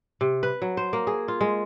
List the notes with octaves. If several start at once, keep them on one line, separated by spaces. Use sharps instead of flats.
C3
B4
F#3
C5
A#3
G#4
F4
G#3